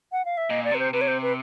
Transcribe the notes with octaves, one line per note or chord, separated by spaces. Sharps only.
F#5
F5
E5
A#2 D#5
D5
C3 B4
C5
C3 B4
C#5
C5
B4